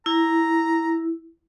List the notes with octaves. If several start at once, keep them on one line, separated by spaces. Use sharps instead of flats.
E4 A#5